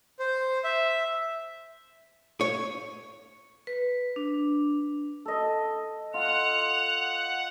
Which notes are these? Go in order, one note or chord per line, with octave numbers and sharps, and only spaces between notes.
C5
E5
C#5
B4
D4
A4 D#5
F4 F#5 F7